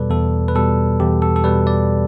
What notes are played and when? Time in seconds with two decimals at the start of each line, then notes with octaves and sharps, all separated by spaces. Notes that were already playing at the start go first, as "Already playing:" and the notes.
Already playing: E2 B2 G3 A4 B4 D5
0.10 E2 A4
0.48 B4
0.55 B2 G3 A4
1.00 E2 G4
1.22 A4
1.36 A4
1.44 B2 G3 B4
1.67 D5